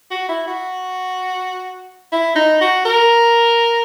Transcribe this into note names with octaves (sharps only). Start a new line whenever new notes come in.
F#4
E4
F#4
E4
D#4
F#4
A#4